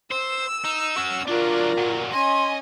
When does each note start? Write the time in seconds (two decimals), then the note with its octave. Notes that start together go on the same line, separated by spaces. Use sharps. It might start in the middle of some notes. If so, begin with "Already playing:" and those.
0.12 C5 E6
0.64 D#4
0.98 C#4 F#4
1.28 F#3 D4 F4 A#4 D5
1.77 A#2 F#3
2.13 C#4 D#5 G#5 C6